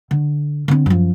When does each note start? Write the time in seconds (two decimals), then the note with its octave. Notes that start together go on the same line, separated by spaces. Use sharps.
0.11 D3
0.68 D3 C4
0.86 F#2 F3